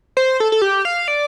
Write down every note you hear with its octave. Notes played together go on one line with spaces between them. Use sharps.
C5
A4
A4
G4
F5
D5